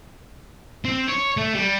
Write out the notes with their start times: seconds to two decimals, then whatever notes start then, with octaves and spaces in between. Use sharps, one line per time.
0.85 C4 C5
1.08 C#5
1.37 A3
1.54 G3